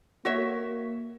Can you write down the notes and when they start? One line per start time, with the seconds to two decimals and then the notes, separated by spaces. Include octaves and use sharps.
0.25 A#3 F#4 C#5 E5